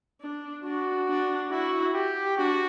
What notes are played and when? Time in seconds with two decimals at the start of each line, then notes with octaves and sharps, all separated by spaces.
0.21 D4
0.64 D4 F#4
1.08 D4
1.51 E4 F#4
1.94 G4
2.37 D4 F#4